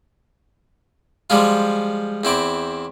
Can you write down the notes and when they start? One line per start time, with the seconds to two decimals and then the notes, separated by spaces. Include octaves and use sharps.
1.30 F3 G3 G#3 F4
2.24 E2 C4 E4 D6